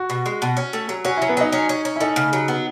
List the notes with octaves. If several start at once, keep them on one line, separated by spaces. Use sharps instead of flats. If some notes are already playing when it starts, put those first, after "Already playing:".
Already playing: F#4
B2
G#3
B2
C#4
A3
F#3
C#4 F#4
F#3 E4
B3
F#3 D#4
C#4
C#4
C#4
E4
A3 D#4
C#3
F#3
B3